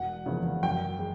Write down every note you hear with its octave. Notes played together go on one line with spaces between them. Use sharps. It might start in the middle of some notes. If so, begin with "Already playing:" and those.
Already playing: E1 F#5
E2 C#3 F3 A#3
F#2 G5
G#3